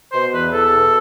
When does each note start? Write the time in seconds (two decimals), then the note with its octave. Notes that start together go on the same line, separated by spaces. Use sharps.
0.13 B2 C5
0.32 E2 B4
0.52 E2 A4
0.72 B2